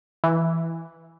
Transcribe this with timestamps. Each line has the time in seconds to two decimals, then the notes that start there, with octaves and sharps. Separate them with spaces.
0.24 E3